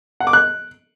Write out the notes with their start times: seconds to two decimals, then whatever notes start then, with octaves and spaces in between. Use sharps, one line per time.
0.20 F#5
0.27 D6
0.33 F#6